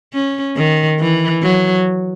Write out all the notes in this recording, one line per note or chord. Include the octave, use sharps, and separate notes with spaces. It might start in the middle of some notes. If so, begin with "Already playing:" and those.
C#4
D#3
E3
F#3